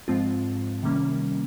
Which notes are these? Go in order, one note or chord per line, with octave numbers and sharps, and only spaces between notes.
G#2 F3 G#3 C4 F4
C3 D#3 G3 A#3 C#4